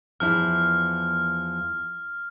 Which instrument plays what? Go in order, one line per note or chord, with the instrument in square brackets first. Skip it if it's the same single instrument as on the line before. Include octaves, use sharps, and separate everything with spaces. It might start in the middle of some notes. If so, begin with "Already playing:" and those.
[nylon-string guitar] E2 F3 E4 [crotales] F6